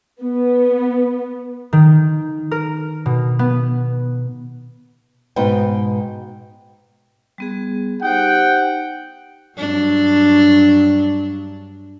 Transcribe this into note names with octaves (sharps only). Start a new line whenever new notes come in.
B3
D#3
A#4
B2
B3
G#2 B2 D#4 B4 G5
G3 B3 G#4
D#4 G4 C5 F#5 G5
G2 F#3 D4